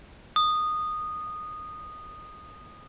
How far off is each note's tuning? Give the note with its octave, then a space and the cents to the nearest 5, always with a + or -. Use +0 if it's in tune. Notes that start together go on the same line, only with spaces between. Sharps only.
D#6 -15